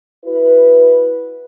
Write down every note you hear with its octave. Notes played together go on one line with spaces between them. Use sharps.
E4 F#4 B4